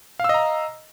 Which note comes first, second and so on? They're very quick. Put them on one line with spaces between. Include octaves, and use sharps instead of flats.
F5 E6 D#5 A#5